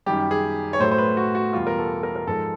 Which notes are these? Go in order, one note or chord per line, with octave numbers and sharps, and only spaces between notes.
F#2 D#3 G3 G4
G#4
C#5
A2 F#3 A3 C5
C5
B4
F#4
F#4
E2 B2 G3 F4
A#4
A4
A#4
A#4
G#2 F3 G#3 A4